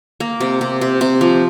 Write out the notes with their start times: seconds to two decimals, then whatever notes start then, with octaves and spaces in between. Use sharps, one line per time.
0.20 A#3
0.40 C3
0.61 C3
0.81 C3
1.01 C3
1.21 F3